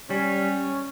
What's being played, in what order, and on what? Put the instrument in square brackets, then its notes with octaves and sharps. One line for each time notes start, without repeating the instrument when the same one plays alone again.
[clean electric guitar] G3 [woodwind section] C#4